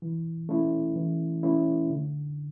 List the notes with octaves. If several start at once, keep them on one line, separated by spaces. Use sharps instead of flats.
E3
A3 C#4 E4
E3
A3 C#4 E4
D3